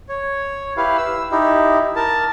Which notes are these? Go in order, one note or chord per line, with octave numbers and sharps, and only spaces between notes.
C#5
E4 G4 B4 F5
E6
D#4 E4 G4
A#4 A5